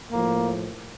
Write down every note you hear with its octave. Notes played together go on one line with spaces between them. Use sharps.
A2 F3 A#3